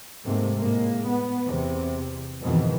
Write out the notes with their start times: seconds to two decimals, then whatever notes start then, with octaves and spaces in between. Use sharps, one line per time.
0.24 G#2 C3 A3 A#3
0.57 A2 G#3 A#3
1.08 B3
1.45 E2 C3
2.41 F2 G#2 B2 D#3 E3